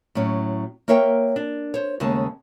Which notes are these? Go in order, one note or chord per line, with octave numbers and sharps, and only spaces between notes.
A2 F#3 C#4
A#3 A#4 C#5 E5 F5 G5
D4
C5 C#5
D#2 C#3 G#3 A3 A5